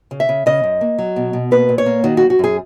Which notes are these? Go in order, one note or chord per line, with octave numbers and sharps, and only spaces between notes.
C#3
E5
C#3
C#3 D#5
F#2
A#3
F#3
B2
B2
A#3 B4
A#2
C#5
A#3
D#3 F#4
F#2 F#4
F#4
F#2 G#4